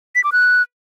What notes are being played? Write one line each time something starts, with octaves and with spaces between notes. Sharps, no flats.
B6
D6
F#6